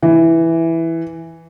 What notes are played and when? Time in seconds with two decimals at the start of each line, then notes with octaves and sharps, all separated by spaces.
0.03 E3